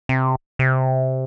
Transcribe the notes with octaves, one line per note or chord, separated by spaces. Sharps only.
C3
C3